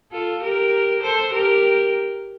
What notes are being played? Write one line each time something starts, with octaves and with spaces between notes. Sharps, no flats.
F4 A4
G4 A#4
A4 C5
G4 A#4